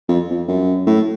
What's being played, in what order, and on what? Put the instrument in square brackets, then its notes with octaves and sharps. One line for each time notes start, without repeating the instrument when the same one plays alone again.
[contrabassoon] F2
F2
F#2
A2